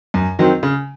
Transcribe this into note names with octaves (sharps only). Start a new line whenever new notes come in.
F#2
D#3 F#3 C4
C#3